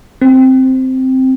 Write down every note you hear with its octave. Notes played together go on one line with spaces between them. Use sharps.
C4